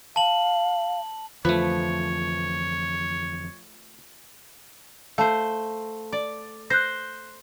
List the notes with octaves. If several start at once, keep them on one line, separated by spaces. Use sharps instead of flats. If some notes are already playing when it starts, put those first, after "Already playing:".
F5 A5 F#7
F2 D3 E3 F3 A3 B4 C#5
A3 C5 F5 A5
D5
C5 F#6 G6 A#6